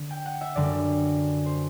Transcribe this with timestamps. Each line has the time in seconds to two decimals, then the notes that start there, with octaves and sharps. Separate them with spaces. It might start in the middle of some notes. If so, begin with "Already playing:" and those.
Already playing: D3
0.11 G5
0.26 F#5
0.41 E5
0.56 F#2 D3 G3 D5
1.46 C5